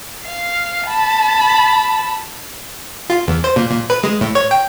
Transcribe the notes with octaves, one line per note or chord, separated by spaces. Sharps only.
F5
A5 B5
F4
E2
C5
A#2
A#2
B4
G#3
A2
C#5
G5